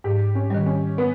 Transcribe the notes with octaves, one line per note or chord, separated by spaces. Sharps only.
G#2 G4
C#4
D#3 G3
C#4
B3